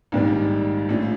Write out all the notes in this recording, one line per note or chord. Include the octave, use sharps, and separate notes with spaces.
A#1 G#2 D#3 G3
A#1 A2 F3